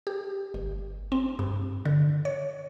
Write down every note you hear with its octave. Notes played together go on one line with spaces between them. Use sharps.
G4
G1
C4
G2
D3
C#5